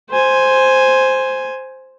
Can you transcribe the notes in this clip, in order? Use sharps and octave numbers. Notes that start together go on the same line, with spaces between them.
C5 G#5